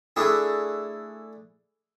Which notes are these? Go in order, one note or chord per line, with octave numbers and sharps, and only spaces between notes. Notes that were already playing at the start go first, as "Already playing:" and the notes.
A3 D4 E4 G#4